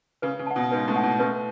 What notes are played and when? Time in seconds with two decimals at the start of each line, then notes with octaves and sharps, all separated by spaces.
0.22 C#3 B4
0.39 C#3
0.47 F#5 A5
0.56 B2
0.71 G#2 B4
0.88 A2
0.96 F#5 A5
1.03 B2
1.19 A2 B4